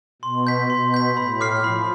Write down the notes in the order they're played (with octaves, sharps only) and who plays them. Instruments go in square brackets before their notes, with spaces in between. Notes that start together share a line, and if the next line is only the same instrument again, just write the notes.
[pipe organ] B2 [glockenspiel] C6
[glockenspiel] G6 B6
[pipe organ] B2 [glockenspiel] C6
[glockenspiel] G6 B6
[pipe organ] A2 [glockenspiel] B5
[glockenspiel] D6 F6 C7
[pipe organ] F3 [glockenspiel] B5